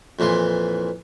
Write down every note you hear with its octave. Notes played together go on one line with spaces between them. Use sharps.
F2 A#2 E3 C6